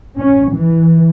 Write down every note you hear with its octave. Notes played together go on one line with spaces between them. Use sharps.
C#4
E3